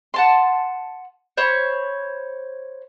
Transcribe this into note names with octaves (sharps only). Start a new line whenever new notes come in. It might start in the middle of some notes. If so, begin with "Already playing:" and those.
F#5 A5 C6
C5 C#5 B5